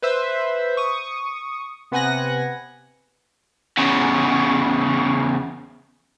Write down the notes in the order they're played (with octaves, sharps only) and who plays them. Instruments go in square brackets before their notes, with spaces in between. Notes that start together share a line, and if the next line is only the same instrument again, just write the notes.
[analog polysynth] B4 C5 E5
C#6 D#6
C3 B3 F#5 G#5 F#6 A#6
[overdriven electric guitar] E2 C#3